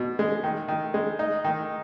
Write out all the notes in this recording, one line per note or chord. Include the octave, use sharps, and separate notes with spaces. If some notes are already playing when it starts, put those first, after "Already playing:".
Already playing: B2
G#3
D#3
D#3
G#3
D#4
D#3